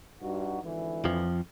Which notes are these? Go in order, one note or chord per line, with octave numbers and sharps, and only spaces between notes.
G2 D#4 F#4
G#1 D3 E3
F2 F3